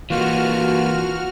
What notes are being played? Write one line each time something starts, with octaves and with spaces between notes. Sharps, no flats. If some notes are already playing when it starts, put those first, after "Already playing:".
E3 A#3 F4 F#4 F6